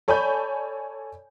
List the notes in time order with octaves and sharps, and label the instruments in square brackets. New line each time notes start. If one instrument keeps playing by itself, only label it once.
[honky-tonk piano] A4 C#5 D5 G#5 B5 G6